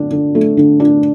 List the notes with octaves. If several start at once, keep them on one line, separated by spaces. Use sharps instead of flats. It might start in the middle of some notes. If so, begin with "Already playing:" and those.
Already playing: D3 D4
D3
A3
D3
D4